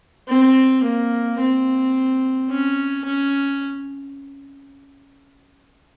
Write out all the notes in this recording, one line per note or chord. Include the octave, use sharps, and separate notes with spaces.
C4
A#3
C4
C#4
C#4